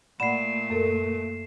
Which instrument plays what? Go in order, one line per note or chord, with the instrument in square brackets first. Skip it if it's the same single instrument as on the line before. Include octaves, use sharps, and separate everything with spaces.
[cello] A#2 A3 [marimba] D5 F#5 B5 [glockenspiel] C7 E7
[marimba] F#2 A4 A#4